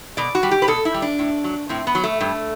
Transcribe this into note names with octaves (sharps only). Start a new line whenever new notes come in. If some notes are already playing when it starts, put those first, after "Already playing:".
B2 D5
F#4
G3
G4
B4
B2 A4
E4
G3
D4
A2
F#3
A2 C4
B3
F#3
A3
G2